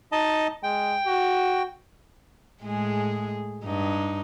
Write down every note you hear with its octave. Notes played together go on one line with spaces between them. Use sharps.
D#4 D#5 A5
G#3 G5
F#4
A2 G#3 G#4
G2 D#4